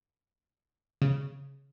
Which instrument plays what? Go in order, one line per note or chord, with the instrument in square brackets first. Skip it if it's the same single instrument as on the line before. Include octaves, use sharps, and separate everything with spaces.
[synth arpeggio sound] C#3